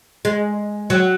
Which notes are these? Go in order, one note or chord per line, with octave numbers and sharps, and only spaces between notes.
G#3
F#3